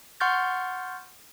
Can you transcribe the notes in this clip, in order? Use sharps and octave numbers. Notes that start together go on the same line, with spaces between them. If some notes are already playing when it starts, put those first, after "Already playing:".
F#5 C6 C#6 F6 G6 A6